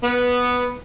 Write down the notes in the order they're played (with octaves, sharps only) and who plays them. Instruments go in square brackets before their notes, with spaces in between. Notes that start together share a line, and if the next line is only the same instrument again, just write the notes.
[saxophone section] B3